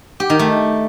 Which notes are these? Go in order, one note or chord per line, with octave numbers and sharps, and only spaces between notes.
G4
D#3
A3